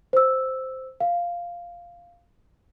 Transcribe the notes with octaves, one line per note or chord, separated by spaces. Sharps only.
C5 E6
F5